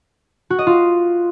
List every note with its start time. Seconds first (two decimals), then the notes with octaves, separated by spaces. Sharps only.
0.50 F#4
0.59 D#5
0.67 F4